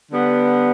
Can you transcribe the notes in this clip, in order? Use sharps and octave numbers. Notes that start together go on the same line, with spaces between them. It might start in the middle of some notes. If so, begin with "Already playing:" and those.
D3 G3 B3